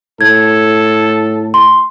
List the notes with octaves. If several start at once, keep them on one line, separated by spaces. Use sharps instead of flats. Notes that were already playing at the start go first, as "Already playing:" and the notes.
A2 A4 G#6
C6